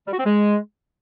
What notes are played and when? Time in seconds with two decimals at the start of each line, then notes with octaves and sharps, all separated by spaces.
0.07 G3
0.13 F#4
0.19 C4
0.25 G#3